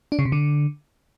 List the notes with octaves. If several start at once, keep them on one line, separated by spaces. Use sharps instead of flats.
D4
C#3
C3
D3